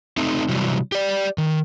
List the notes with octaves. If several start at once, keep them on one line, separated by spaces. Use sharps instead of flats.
A3 C4 D#4
C3 E3 F#3 G3
G4 D5
D#3